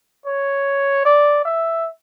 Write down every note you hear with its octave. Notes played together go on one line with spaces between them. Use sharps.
C#5
D5
E5